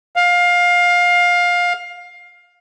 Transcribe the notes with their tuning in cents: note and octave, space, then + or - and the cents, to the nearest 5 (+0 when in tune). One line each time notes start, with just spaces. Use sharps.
F5 +20